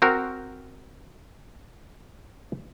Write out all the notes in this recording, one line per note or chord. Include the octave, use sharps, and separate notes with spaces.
C4 F#4 A#4